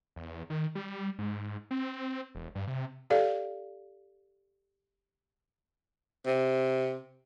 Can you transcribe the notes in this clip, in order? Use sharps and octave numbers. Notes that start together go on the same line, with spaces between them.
E2
D#3
G3
G#2
C4
E1
G2
C3
G4 A4 D5 F5
C3